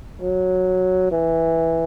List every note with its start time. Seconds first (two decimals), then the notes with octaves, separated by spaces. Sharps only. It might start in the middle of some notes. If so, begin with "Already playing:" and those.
0.22 F#3
1.12 E3